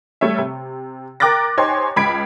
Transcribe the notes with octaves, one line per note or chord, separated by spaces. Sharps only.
G3 A3 C#5 E5
C3
A#4 G5 D6 F#6 A6 A#6
D#4 G4 C5 C#5 G#5 C6
C#2 B5 G#6 B6 D7